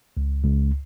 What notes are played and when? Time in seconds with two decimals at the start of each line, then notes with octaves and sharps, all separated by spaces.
0.17 C#2
0.45 C#2